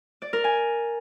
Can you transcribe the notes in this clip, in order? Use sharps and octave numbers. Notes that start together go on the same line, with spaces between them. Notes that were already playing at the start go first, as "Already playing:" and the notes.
D5
A#4
G#5